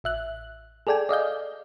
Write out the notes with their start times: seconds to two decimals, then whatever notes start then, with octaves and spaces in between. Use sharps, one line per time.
0.04 A1 E5 F#6
0.87 G#4 A4 D5 G5 G#5
1.09 D5 D#5 F5 G6